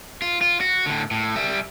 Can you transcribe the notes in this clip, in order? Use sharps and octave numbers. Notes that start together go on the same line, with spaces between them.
F4
F4
F#4
A2 D3
A2
G3 E5